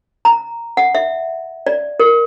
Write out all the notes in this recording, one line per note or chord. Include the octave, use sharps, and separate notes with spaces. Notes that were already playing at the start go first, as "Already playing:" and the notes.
A#5
F#5
E5
D5
A#4